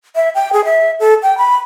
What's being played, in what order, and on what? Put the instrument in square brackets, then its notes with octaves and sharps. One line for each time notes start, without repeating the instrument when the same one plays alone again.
[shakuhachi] E5
G5
G#4
E5
A4
G5
B5